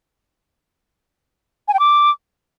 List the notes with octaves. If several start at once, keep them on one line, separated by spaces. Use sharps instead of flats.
G#5
G5
D6